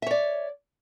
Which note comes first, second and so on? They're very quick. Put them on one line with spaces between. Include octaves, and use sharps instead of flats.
E5 C#5 D5